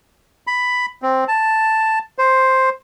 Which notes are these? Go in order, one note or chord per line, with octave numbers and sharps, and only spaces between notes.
B5
C4
A5
C5